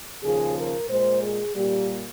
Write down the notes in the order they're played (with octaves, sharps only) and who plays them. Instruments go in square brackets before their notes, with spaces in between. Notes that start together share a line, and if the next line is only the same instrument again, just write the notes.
[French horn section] D#2 C#3 F3 G#4
A#4
A#2 G#3 C5
G#4
A#2 G3 A#3 G4